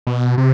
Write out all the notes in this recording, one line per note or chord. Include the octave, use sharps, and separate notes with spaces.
B2
C3